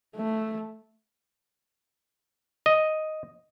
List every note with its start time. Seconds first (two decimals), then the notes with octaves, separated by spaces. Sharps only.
0.16 A3
2.66 D#5